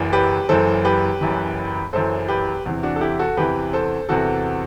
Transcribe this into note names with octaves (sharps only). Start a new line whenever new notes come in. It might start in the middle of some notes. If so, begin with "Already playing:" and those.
Already playing: F#1 F#2 E3
G4 B4
F#1 F#2 E3 A4 C5
G4 B4
F#1 F#2 E3
F#1 F#2 E3 A4 C5
G4 B4
E2 C3 E3
D4 F#4
A4
E4 G4
F#4 A4
E2 C3 E3 G4 B4
A4 C5
E2 C3 E3 F#4 A4